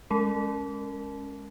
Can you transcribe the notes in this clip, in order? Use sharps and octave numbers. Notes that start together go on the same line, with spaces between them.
G#3 C#4 A#4